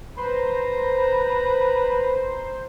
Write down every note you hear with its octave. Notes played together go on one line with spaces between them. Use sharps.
B4 C5 A#5